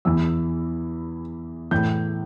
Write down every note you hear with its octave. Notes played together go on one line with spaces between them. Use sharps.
E2 E3 E6
A2 E3 G6